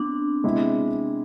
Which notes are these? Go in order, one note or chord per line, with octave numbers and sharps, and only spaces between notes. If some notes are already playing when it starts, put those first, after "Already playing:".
Already playing: B3 C4 D4
C3 G#3 B3 E4